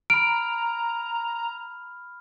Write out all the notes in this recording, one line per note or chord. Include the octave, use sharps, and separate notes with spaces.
A#5 B5 F6 D7